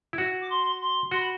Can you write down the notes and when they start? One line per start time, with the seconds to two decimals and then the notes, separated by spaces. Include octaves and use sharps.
0.13 E4
0.18 F#4
0.41 D6
0.50 C6
0.81 C6
1.11 F#4 C6
1.20 B5